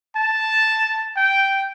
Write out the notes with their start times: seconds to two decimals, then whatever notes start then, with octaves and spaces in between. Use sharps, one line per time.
0.16 A5
1.16 G5